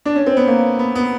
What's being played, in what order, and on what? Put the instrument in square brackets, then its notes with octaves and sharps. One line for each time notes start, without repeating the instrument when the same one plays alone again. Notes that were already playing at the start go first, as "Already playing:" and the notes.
[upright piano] D4
C#4
C4
B3
A#3
B3
B3